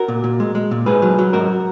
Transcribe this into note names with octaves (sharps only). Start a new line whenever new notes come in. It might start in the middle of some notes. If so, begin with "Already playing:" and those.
Already playing: F#4 A#4
A#2
A#2
G#3
G#3
A#2
G#2 G#4 B4
F#3
F#3
G#2 F#4 A#4